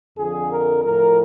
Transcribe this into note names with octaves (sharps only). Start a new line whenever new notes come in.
F2 D3 F3 G#4
A#4
A2 F3 A#4